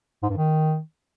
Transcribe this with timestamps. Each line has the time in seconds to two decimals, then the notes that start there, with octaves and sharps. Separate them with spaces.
0.23 G#2
0.30 G2
0.36 D#3